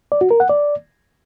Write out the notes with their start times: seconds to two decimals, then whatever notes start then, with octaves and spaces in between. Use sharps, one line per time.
0.12 D5
0.21 F#4
0.31 A#4
0.40 F#5
0.49 D5